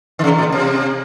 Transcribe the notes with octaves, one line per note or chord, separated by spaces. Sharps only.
D#3
C#3
A#2
C3